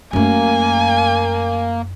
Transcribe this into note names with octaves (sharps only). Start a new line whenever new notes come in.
F#2 A3 A#3 G#5